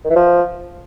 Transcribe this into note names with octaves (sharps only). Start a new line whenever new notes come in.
D#3
E3
F3